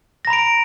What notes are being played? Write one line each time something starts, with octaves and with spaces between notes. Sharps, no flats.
A#5 B5 A#6 D7